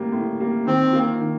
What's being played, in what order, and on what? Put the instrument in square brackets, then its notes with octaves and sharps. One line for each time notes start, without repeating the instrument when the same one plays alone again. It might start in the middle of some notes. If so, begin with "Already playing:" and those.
Already playing: [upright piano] A2 G3 A#3
A2
G3 A#3
[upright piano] D#3 [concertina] C4
[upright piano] A#3 F4
D#3